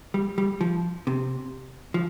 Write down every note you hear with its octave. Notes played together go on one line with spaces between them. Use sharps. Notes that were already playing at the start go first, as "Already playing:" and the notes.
G3
G3
F3
C3
F3